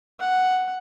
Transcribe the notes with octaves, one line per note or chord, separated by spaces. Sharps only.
F#5